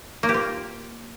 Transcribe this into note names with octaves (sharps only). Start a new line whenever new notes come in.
A#3
G4
F4